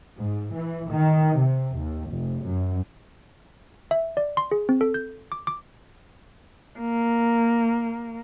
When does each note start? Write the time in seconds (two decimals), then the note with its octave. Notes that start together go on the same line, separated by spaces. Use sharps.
0.17 G#2
0.54 E3
0.90 D#3
1.38 C3
1.76 D#2
2.09 F1
2.44 F#2
3.91 E5
4.17 D5
4.37 C6
4.52 G#4
4.69 C4
4.81 A4
4.94 G6
5.32 D6
5.47 D6
6.80 A#3